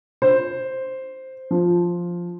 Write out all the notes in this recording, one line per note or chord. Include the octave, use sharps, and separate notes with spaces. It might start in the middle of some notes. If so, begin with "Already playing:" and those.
C5
F3